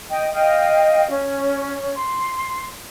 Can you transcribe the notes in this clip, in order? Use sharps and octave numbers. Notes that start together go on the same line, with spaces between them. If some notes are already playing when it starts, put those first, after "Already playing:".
D#5 G5
D#5 F5 G5
C#4
C6